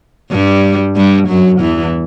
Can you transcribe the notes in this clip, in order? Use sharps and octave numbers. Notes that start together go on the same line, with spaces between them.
G2 G3
G2 G3
F#2 F#3
E2 E3